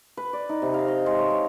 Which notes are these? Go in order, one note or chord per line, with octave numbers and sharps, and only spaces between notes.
B4
D5
D#4
C3
F5
D#5
G#3
C#5
C#5